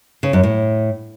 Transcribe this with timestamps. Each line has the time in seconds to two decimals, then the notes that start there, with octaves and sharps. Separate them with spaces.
0.23 C#3
0.33 F#2
0.43 A2